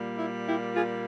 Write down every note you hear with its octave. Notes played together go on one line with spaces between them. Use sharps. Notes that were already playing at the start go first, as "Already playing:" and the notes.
Already playing: A#2 G3 A#3
E4
E4 G4
F4 G#4